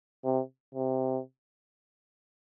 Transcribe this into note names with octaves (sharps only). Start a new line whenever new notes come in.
C3
C3